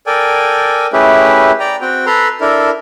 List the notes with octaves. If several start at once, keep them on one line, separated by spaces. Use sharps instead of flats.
A4 A#4 D5 G5 G#5
A3 C#4 E4 G4 G#4 B4
D5 G5 A#5
C4 F#4 G5
A4 B4 A#5 C6
D4 E4 A4 A#4